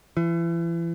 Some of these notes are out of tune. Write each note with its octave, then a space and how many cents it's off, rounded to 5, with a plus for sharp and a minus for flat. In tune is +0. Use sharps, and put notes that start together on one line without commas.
E3 +35